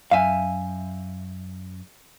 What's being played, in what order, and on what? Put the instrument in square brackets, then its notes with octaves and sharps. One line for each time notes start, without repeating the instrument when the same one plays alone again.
[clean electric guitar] F#2 G#5 [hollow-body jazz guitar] E5 F5